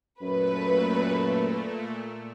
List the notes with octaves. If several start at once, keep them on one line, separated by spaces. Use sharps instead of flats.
F#2 A#2 A3 B4